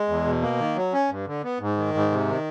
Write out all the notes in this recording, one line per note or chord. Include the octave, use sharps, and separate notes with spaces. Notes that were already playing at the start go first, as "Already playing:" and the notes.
Already playing: G#3
E2
B2
A#3
D#3
F#3
C#4
G2
D3
B3
G#2
D#3
G#2
C3
D#3